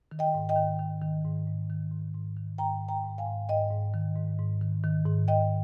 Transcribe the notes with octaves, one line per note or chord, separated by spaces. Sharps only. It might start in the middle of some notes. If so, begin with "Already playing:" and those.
D#3
D#5 G5
G#2
D#5 G5
D#3
D#3
D#3
G#2
G#2
D#3
G#2
G#2
D#3
G#2 G5 A#5
G#2
G5 A#5
G#2
F5 G#5
G#2
G#2 D#5 G5
G#2
D#3
G#2
G#2
D#3
D#3
G#2
D#3 D#5 G5